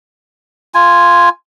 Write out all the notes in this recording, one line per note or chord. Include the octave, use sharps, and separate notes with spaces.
F4 G#5